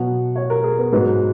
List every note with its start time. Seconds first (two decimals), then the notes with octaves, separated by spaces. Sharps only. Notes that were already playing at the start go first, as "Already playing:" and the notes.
Already playing: B2 F#3 F#5
0.36 C#5
0.50 A#4
0.64 G#4
0.79 B3
0.92 G#2 F#3 B3